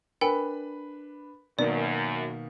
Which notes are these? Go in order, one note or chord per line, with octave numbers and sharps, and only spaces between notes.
D4 A#4 B4 G5 G#5 B5
F#2 B2 D#3 A#3 D5